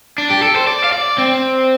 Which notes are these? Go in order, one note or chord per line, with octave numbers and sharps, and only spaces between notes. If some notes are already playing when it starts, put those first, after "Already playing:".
D4
G4
A4
C5
D5
F5
D5
C4